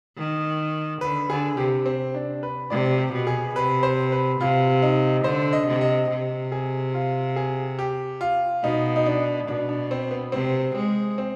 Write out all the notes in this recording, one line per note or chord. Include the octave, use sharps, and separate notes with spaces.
D#3
D3 B4
D3 G#4
C3 G4
C4
D4
B4
C3 D5
G4
B2
G#4
C3 B4
C5
B4
C3 F4
D#4
D3 C5
D#5
C3
D#5
C3
G#4
F4
G#4
G4
F4
B2 D#4
D#4
D4
B2 D4
D4
C4
B3
C3 C4
G#3 C4
C4